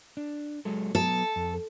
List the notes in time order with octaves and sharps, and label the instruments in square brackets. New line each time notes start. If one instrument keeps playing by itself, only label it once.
[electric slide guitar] D4
F#3 G#3 A4
[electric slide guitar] F#3 B3 [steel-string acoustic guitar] A4
[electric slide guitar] F2